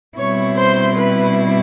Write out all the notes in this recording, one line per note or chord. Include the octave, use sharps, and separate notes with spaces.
B2 G3 C4 E4 C#5 C#6
C5 C6
B4 B5